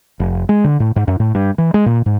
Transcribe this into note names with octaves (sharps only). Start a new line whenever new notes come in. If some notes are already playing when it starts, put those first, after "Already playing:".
F1
G#3
D3
A2
G#2
F#2
A2
G2
E3
G#3
A#2
G#2